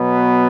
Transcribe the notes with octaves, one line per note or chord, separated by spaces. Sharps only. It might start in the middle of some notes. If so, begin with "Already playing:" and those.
Already playing: B2 F#3 B3